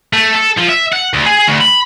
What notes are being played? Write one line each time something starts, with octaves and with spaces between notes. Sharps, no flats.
A3
A4
F3
E5
F#5
D2
G#4
D2
B5